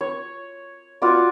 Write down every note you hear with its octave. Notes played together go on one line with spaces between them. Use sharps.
C#5
F4 F#4 D5